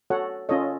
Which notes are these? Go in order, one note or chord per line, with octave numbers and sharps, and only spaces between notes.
F#4 A4 C#5 F#5
C#4 F4 A4 C#5 D#5